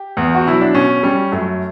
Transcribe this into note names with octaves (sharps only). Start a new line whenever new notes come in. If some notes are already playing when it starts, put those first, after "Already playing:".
Already playing: G4
E2
F#4
B2 F#3 E4
D4
B2 C#4
G3 C#4
F#2 A3